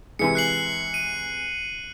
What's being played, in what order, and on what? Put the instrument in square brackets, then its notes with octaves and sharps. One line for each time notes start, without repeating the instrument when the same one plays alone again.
[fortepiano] C3 E3 G#3 [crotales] C#7
[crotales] F#6 C7 F#7
D#7